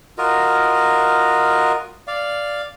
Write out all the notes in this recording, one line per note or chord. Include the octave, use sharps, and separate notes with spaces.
F4 F#4 A#4 D#5
D5 F5